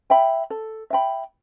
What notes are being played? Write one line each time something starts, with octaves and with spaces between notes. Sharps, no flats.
E5 G5 B5
A4
E5 G5 B5